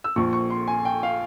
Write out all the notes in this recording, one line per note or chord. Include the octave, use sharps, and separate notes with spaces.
E6
A#1 A#2 F3 C#6
C#6
C6
G#5
G5
F5